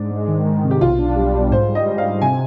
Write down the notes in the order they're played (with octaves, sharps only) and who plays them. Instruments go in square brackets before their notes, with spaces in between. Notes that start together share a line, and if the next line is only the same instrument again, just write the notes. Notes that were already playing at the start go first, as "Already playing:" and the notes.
Already playing: [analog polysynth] G#2 [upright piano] D4
[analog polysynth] G#3
D#3
D#3
C3
[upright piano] G4
[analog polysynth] B1 [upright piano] F4
[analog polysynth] D4
G3
B2
[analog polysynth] G#2 [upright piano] C5
[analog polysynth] G3
[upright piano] D#5
[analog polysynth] G#2
[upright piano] F5
[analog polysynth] G#2
[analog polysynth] C3 [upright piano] G#5